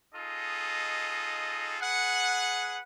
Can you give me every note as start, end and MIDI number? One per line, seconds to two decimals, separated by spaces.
0.15 1.76 63
0.15 1.76 65
0.15 1.76 68
0.15 1.76 69
0.15 1.76 75
1.80 2.80 68
1.80 2.80 71
1.80 2.80 78